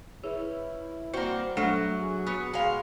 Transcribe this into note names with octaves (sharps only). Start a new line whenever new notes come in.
E4 G#4 B4 C#5
G3 A#3 C4 F#4 C5 F#5 A#5
F#3 A3 D4 A4 E5
F#4 G#4
B3 D#6 B6 C#7
G#3 F5 A#5 B5